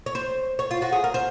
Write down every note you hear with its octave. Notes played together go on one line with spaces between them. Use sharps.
C#5
C5
C#5
F4
F#4
G#4
A#4
C5